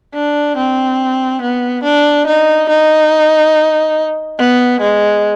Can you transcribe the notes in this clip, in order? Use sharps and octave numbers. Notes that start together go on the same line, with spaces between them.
D4
C4
B3
D4
D#4
D#4
B3
G#3